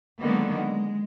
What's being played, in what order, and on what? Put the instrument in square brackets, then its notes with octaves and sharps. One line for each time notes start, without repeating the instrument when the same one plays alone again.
[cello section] D3 D#3 F#3 G#3 A#3 B3
G#3